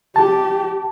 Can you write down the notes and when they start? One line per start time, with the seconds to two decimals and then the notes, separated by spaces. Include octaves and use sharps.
0.16 G4 A5